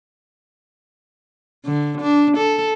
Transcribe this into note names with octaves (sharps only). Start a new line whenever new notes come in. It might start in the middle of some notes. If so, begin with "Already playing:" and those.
D3
D4
A4